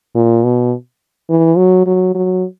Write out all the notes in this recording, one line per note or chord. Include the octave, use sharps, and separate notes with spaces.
A#2
B2
E3
F#3
F#3
F#3